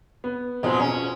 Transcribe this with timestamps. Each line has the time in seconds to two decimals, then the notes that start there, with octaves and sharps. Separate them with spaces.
0.24 B3
0.63 F2 G#2 B2 F3 F#3 G#3
0.80 C#4